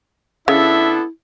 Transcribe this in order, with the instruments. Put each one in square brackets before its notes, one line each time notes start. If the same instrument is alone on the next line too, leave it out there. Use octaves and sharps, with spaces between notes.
[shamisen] C#3 [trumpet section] B3 D4 A4 [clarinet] E4 [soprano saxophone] E5